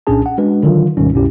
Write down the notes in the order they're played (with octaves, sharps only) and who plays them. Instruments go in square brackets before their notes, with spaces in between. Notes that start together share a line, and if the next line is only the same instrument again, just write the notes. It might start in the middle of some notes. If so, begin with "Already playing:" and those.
[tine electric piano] C2 A#2 C#4 D4 G#4 A5
F#5
G#3 D4 F#4 B4
D3 D#3 F#3 F4
D2 G#2 B2 D#3 G3 C#4
C2 F#2 B2 C#4 E4 G4